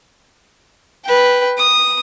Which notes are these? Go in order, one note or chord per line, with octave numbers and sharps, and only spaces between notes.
B4 G5
D#6